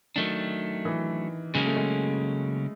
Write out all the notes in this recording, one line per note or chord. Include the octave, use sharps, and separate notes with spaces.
D#3 F#3 A3 D4
E3
C#3 F#3 G#3 A#3 C#4
A3
G#3